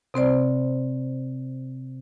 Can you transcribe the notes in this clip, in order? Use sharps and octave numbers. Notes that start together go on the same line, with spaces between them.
C3 C4 C5 D5